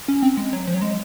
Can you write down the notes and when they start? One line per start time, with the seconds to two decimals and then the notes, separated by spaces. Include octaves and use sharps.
0.08 C#4
0.22 C4
0.37 G#3
0.53 F#3
0.67 F3
0.74 F#3
0.82 G#3